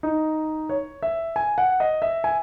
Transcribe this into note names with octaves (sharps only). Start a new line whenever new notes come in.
D#4
C#5
E5
G#5
F#5
D#5
E5
G#5